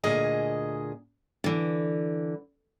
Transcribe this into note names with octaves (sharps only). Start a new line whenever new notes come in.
D2 A#2 G#4 D#5 G#5
D3 E3